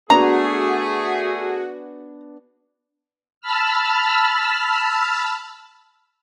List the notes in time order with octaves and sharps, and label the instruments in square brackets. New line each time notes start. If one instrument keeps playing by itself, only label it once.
[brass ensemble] A3 G#4 [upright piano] B3 D4 [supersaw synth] F#4 [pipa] A#5
[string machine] A5 B5 E6 F6